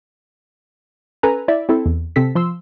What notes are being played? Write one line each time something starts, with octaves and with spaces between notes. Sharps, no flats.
C#4 A4 B4 G#5 A#5
E4 D5 E5
C4 E4 A4
E2
C3 C4 A4 B6
F3 C6 E6